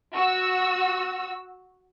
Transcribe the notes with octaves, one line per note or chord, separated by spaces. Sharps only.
F#4 E6